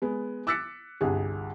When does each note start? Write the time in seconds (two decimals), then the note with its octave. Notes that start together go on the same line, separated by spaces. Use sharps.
0.02 G#3 B3
0.47 D6 E6 F#6 A6 B6 C#7
1.01 G1 C2 G#4